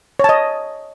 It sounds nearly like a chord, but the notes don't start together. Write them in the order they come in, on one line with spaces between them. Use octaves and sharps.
C#5 A5 D#5